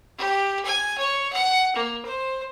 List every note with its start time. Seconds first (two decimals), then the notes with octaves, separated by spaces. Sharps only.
0.18 G4
0.65 G#5
0.97 C#5
1.33 F#5
1.76 A#3
2.05 C5